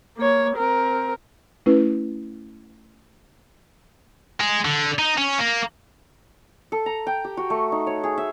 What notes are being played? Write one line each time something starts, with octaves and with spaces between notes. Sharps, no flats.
A#3 C#5
C4 A#4
A3 C#4 E4 B4
G#3
D3
D#4
C#4
A#3
A4
A#5
G5
G4
F#4
A3
D#4
C#5
G#4
E5